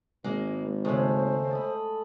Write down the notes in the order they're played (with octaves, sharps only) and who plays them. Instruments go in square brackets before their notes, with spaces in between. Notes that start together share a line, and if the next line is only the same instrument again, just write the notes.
[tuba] G#1 [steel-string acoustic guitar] G#3 A#3
[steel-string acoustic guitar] D#2 C#3 [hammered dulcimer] G#3 A3 [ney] C5
[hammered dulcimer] A4 D#5 B5